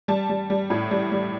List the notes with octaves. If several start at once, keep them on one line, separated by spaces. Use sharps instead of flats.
G3 A5
G3
G3
A2
G3
G3